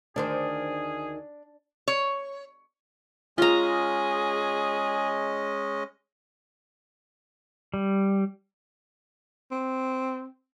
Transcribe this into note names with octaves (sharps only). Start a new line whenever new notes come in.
D2 D#3 D4 G#4 C5
C#5
G#3 C#4 F4 G#4 D#5 A#5
G3
C4